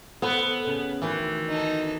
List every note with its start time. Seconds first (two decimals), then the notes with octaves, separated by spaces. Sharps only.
0.22 B3 A4 C5
0.67 C#3
1.02 D2 D#3 E3
1.49 D#4 A4